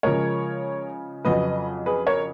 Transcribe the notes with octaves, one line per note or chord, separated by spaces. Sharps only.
C#3 F3 G#3 A#4 C#5
F2 C#3 F#3 B4 D#5
G#4 B4
A#4 C#5